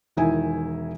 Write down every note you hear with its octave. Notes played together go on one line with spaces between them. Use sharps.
E1 D#3 E4 G#5